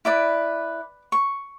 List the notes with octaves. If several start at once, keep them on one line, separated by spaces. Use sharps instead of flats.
E4 B4 D5 D6
C#6